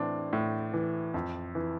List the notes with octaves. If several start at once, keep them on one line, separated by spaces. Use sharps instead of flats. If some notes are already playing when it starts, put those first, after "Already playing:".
Already playing: A2 E3 C4 D4
A2
E3
F2
E3